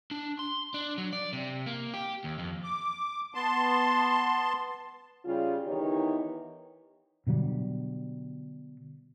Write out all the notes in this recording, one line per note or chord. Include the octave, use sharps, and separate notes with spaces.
D4
C6
D4
F#3
D5
C3
A#3
G4
D#2
F2
D6
B3 A5 C6
C#3 G3 F4
D#3 E3 B3 D#4 G4 C#5
B2 D3 F#3 G3